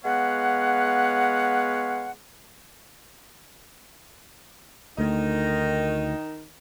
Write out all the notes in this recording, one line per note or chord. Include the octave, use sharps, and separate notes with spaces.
G#3 B3 B4 C#5 F5 F#5
D2 D#3 A3 D#4